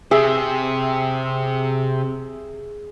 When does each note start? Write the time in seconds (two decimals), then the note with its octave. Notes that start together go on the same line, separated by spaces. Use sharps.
0.11 C3 G4 G#4 E5